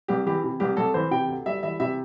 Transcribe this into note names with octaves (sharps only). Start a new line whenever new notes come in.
C2 G4
E3 G4
C3
C2 G4
C2 A4
E3 C5
C3 G5
D2
G3 E5
E3 E5
C3 E5